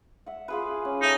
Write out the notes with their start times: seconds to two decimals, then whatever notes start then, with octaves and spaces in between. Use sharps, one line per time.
0.26 E5 F#5
0.48 F4 G#4 B4
0.85 C#4
1.02 D#4 A4 E5